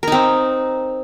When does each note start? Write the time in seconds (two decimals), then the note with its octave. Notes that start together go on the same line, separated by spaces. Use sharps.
0.03 A#4
0.08 D#4
0.12 C4